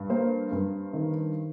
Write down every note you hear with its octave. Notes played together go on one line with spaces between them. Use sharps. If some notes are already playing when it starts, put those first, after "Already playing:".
Already playing: G2
A#3 C5
G2
D#3